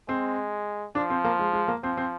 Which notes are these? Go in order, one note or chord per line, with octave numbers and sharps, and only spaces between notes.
G#3 C4
F3 D4
C4
A#3
G#3
G#3
A#3
F3 C4
C4